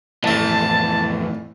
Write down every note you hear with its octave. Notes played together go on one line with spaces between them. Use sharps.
A1 F2 E3 A3 A5